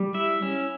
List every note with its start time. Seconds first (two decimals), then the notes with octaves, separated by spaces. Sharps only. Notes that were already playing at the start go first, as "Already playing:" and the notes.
Already playing: G3
0.14 E4 E5
0.42 C#4